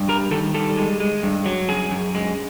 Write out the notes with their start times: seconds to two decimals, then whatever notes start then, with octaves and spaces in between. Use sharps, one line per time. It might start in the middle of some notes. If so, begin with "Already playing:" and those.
Already playing: G2
0.09 G3 A#4
0.31 D#3 A4
0.54 G3 A4
0.77 G#3
1.00 G#3
1.23 G2
1.46 F#3
1.69 F#2 G#4
1.91 F#2
2.15 G#3